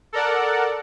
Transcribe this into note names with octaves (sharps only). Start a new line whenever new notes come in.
A4 A#4 D5 F#5